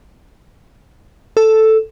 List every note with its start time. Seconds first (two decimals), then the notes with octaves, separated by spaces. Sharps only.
1.37 A4